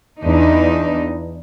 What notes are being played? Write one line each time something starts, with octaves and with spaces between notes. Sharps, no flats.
E2 D4 D#4